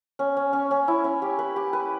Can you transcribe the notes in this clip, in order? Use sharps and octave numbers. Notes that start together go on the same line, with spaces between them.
C#4
C#4
C#4
C#4
E4
C#4
G4
B4
G4
B4